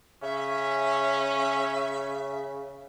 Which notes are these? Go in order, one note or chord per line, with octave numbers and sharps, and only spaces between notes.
C#3 C#4 E5